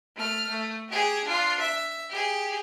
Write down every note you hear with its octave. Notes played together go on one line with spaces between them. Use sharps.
A3 F6
A3
G4 G#4
D4 F4
E5
G4 G#4